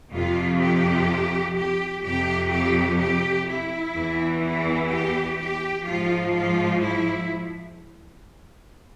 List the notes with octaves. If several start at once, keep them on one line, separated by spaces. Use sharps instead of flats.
F2 C3 F3 F4
G4
G4
F2 C3 F3 G4
G4
G4
E4
E2 E3
E4
G4
G4
G#2 F3 F4
F4
E4